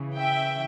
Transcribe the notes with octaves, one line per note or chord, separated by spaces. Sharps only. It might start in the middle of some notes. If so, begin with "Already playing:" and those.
Already playing: C#3 E3
E5 G5